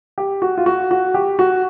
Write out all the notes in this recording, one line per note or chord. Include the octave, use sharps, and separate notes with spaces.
G4
F#4
F4
F#4
F#4
G4
F#4